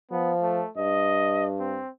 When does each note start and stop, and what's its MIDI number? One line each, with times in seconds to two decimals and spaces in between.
0.11 0.61 53
0.11 0.32 59
0.42 0.70 57
0.77 1.80 43
0.77 1.47 75
1.60 1.90 60